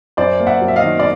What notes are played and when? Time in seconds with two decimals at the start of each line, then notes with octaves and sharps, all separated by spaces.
0.17 F#2 C5 D5
0.40 A#3
0.47 E5 F#5
0.61 F#3
0.68 E5
0.76 D#5 F5
0.84 D#3
1.00 D5